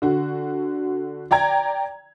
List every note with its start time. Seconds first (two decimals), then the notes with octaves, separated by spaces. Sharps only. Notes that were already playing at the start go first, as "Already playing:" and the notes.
0.02 D3 F#4
1.31 D5 G5 A#5 G#6